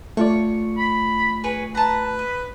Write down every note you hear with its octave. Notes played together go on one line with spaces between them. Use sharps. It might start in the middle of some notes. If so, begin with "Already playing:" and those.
A3 F4 C#5 D5
B5
G#4 B4 C#5
B4 A5 A#5
D#5